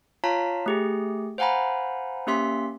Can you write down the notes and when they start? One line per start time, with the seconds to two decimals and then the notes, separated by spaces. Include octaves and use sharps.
0.24 F4 C#5 F5 A5 A#5 B6
0.66 A3 G4 G#4
1.38 C5 F5 F#5 G#5 A#5 B5
2.27 A#3 C#4 G4 E5 C6 B6